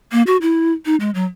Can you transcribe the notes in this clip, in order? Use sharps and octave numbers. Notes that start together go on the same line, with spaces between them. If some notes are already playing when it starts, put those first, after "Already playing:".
A#3
F#4
E4
D#4
G#3
F#3